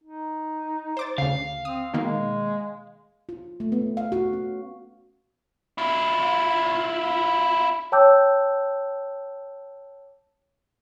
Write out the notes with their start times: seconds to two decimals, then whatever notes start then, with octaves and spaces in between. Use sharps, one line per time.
0.03 D#4
0.97 C5 D6 A6
1.18 D2 C#3 F5
1.65 C4 D#6
1.94 B2 D#3 G#3 A#3
3.29 F4
3.60 A3
3.72 B3
3.97 F5
4.12 F#4
4.33 C#4
5.78 E4 F4
7.92 C#5 G5 A5 D6 E6 G6